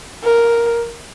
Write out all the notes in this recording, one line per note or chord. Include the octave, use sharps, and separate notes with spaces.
A#4